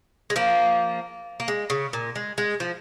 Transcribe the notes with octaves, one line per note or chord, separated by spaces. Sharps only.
G#3
F3 A#3
A#3
G#3
C#3
A#2
G#3
G#3
F3